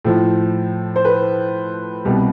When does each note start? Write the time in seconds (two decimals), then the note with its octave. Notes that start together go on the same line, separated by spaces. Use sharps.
0.05 A2 F3
0.96 C5
1.05 B4
2.05 C2 B2 G3